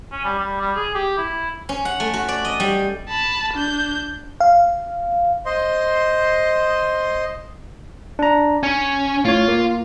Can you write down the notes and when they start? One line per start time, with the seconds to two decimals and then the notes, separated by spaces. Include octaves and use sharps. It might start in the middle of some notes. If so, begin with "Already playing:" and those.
0.12 C#4
0.25 G3
0.39 G3
0.61 G3
0.76 G#4
0.95 G4
1.18 E4
1.69 C#4
1.85 F#5
2.00 A3
2.14 F#4
2.28 D5
2.45 D#5
2.60 G3
3.09 A5 B5
3.54 D4 G6
4.40 F5
5.45 C5 D#5 C6
8.19 D4 A#5
8.63 C#4 G#5
9.25 A2 F4 C#5
9.48 A#3